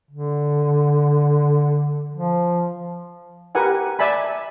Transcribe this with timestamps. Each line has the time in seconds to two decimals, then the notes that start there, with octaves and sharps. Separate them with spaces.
0.11 D3
2.12 F3
3.55 G4 A#4 B4 F#5 G#5
3.99 D5 E5 G#5 A5 B5